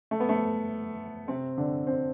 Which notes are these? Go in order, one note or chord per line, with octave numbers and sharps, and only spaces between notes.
A3
B3
A3
C3 C4
D3 D4
C4 C5